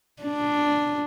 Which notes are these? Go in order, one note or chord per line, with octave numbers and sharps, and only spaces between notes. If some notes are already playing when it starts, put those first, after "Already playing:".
D4